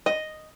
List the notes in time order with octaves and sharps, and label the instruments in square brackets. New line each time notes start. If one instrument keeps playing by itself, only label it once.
[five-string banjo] D#5